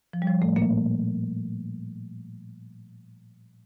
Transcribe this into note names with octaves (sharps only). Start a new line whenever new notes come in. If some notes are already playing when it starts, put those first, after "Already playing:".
F3
G3
F3
A2 A3
A#2 A#3